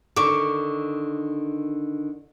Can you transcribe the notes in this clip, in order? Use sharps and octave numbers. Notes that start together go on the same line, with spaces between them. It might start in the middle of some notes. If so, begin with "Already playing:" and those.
D3 D#3 C#6 D6